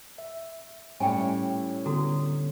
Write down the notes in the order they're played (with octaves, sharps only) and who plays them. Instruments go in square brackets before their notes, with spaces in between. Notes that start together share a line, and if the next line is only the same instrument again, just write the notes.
[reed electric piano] E5
[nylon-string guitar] A2 G3 C#4 [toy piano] G5 G#5
[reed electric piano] D3 B3 [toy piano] F#4 A4 A#5